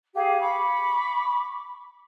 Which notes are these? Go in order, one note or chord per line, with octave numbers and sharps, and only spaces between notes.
G4 G#4 F5
B5 C#6 D6